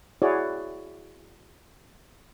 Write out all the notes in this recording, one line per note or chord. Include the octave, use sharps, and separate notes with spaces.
E4 F#4 G#4 C#5 D5